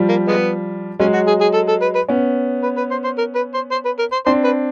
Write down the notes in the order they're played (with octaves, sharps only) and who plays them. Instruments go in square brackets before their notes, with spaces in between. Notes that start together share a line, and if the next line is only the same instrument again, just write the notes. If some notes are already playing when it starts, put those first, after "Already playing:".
Already playing: [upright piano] F3 G3
[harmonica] A#3
G#3 B3
[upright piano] F#3 G#3 [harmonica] C#4
[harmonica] F#4
G#4
G#4
A4
A4
B4
B4
[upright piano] B3 C#4
[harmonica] B4
B4
C5
C5
A#4
B4
C5
C5
B4
A#4
C5
[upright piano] C4 D4 [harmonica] C5
[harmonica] B4